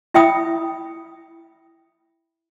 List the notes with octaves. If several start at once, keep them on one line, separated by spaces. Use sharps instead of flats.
E4 E5 G5 B5 D#6